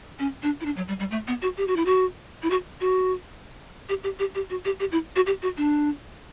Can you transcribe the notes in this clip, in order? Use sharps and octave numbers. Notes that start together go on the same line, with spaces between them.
C#4
D4
E4
D4
F#3
G3
G3
A3
B3
F#4
G4
F#4
E4
F#4
E4
F#4
F#4
G4
G4
G4
G4
F#4
G4
G4
E4
F#4
G4
F#4
D4